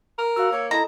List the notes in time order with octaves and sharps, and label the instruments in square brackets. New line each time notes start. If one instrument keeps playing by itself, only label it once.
[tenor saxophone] A#4
[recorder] F#4 [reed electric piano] F5 E6
[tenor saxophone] A#3 [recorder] C#5
[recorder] E4 [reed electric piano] A4 D#5 [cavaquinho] A#5